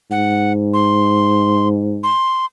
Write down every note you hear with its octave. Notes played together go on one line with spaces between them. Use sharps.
G#2 F#5
C6
C6